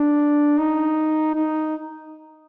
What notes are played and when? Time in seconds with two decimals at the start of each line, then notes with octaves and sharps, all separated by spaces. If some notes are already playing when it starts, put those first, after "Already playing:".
Already playing: D4
0.59 D#4
1.35 D#4